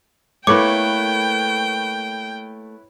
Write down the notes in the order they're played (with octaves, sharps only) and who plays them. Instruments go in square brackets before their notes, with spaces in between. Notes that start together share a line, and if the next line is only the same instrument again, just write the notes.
[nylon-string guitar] A3 A#3 [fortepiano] E4 B4 C#5 [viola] G5 [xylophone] D6